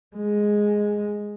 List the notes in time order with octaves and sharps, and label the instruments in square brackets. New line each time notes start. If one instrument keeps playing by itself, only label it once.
[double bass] G#3